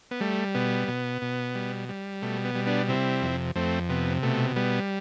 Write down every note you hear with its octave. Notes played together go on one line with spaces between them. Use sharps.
B3
G3 A3
B2 B3
B2
B2
G3
G3
B2 A3
B3
G3
B3 D4
C3 C4 E4
F2
F2 A3 C4
C3 B3
B2 A3
G3 B3